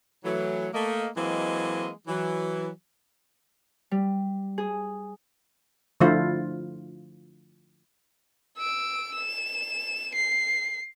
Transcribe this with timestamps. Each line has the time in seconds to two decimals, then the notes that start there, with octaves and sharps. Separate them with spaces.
0.25 E3 F#3 A3
0.74 A3 A#3 D#5
1.17 E3 F#3 G#3 A#3 C4 D#5
2.08 E3 F#3
3.91 G3
4.58 G#4
6.00 D3 F3 A3 E4 F4 C5
8.58 E6 D7
9.14 E7
10.15 C7